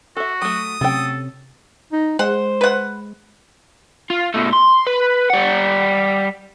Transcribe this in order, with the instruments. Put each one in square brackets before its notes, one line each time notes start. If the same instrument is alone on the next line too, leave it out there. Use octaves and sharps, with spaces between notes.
[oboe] F#4 [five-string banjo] A4 E5
[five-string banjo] F#3 A3 [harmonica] D#6
[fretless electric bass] C3 C#4 [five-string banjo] F#3 A3 G5 [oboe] A4
[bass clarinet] D#4
[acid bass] G#3 [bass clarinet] C5 [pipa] F#5
[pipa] B4 F#5
[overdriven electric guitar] F4
B2 A3
C6
B4
G3 F#5